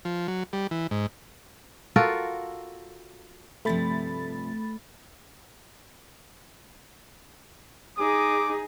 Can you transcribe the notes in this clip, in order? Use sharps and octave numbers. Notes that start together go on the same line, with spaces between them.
F3
F#3
G3
E3
G#2
F4 F#4 A4 A#4
G2 C3 F3 A3 B5 A6
D#4 G#4 D6